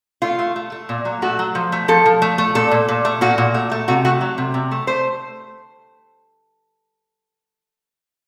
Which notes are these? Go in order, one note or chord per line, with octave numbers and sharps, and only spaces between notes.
A3 F4
A3
A3
A3
A#2
F#3
A3 F#4
F#3
F3
A3
F3 A4
F3
A3
A3
A#2 A4
A#2
A#2
A3
A#2 F#4
A#2
A3
A3
C3 F#4
A3 F#4
F#3
C3
C3
A3
A3 C5